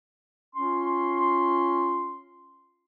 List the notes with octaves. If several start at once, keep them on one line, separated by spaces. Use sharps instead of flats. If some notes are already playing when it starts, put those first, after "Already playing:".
C#4 F4 C6